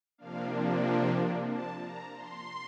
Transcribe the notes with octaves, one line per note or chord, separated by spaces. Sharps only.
C3 F3 A#3 D4 F5
A5
A#5
C6